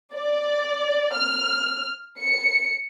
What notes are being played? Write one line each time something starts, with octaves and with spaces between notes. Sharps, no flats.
D5
F6
C#7